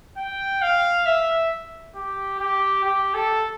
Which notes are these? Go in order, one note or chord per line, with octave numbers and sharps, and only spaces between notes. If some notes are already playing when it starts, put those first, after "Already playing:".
G5
F5
E5
G4
G4
G4
A4